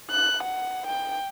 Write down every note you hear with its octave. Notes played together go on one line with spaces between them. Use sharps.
F#6
F#5
G5